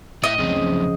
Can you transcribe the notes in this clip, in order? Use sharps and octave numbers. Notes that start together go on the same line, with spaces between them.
A2 D#5 E5
C#2 F#2 C3 F3